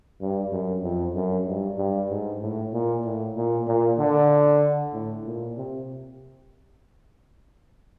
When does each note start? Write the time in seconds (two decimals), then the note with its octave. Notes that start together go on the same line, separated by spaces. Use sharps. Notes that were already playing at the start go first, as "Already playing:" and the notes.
0.21 G2
0.52 F#2
0.83 F2
1.15 F#2
1.47 G2
1.78 G2
2.10 G#2
2.42 A2
2.73 A#2
3.05 A2
3.37 A#2
3.67 A#2
3.99 D3
4.93 A2
5.26 A#2
5.57 C3